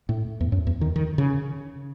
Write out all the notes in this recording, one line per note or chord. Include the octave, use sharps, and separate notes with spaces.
A2
E2
F#2
E2
D#3
D#3
C#3